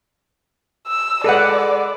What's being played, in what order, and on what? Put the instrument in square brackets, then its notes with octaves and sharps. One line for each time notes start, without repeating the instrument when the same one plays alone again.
[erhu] E6
[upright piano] G#3 B4 [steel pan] A4 F#5 [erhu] D5